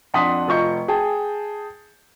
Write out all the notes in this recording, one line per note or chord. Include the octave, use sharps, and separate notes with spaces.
F2 D4 F#5 C6 D#6 B6
F1 F4 D#5 C#6 G6 C#7
G#4 G5 A5